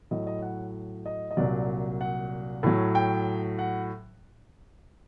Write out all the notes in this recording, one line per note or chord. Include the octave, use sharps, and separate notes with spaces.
A2 F#3 D#5
D#5
F#5
D#5
D#5
C2 A#2 F#3 D5
F#5
A2 F#3
G5
F#5